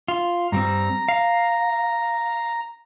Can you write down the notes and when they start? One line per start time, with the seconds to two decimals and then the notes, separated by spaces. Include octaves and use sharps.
0.08 F4
0.52 G2 G3 C4 A#5
1.08 F5